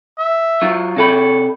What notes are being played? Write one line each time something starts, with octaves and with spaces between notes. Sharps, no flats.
E5
F#3 F4
C3 A4 C#5 B5